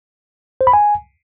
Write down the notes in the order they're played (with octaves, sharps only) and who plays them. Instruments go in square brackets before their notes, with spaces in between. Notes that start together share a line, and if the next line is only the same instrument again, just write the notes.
[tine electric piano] C5
B5
G#5